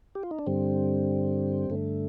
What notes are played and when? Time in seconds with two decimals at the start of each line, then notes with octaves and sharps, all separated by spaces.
0.15 G4
0.23 F4
0.31 D#4
0.39 D4
0.47 G2 D3 G3 C4
1.70 G2 D3 A3